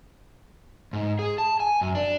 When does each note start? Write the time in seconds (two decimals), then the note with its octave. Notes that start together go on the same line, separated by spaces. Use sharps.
0.93 G#2
1.19 G#4
1.38 A5
1.60 G#5
1.81 F#2
1.95 D4